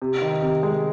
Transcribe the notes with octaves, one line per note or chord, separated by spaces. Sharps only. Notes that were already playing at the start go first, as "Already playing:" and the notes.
C3
D#3
C3
G#3